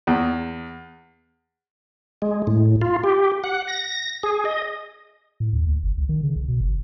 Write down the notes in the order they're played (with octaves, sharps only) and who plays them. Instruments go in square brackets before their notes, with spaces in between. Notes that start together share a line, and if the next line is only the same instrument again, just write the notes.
[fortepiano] E2
[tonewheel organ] G#3
A2
F4
G4
F#5
A#6
G#4
D#5
[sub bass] A2
D#2
D2
G1
C#2
D#3
C#3
B1
B2
G1